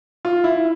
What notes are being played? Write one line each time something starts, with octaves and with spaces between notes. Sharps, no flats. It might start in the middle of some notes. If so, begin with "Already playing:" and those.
F4
E4